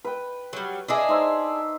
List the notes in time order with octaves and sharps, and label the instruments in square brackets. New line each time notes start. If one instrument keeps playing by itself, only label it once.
[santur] B4 G5
[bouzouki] F#3 G3
[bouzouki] D4 E4 G#4 [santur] D5 D#5
[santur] D#4 C5 E5